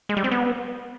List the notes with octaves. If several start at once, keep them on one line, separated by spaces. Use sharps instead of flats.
G#3
G3
C4
B3